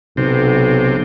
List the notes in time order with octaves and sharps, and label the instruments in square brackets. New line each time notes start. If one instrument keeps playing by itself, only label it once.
[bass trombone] B1 [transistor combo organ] C3